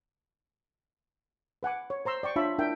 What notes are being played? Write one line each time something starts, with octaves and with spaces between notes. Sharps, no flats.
B4 F#5 G#5 D6
C#5
C5 A#5 C6 E6
D5 G5 C#6
D4 F4 C#5 E5 A5 B5
D4 E4 A#4 E5 G5